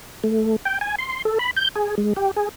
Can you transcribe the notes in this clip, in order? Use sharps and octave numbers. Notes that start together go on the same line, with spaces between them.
A3
G5
G#5
C6
A4
B5
G6
G#4
G#3
G4
G#4